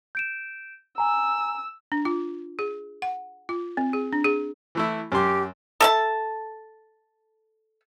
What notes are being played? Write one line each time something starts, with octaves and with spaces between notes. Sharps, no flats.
G6 D7 E7
G#5 A#5 E6
D4
F4
G#4
F#5
F4
C4
G#4
D4
G#4
E3 A3 E4
F#2 G4 C6
A4 E5 A5